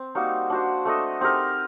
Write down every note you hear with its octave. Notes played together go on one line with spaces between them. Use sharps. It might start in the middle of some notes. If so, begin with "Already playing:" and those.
Already playing: C4
G3 A#3 D#4 F#4
D4 F#4 C5
A3 D4 A4 D#5
C4 D#4 G4 A#4